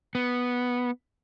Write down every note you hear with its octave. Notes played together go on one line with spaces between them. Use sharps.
B3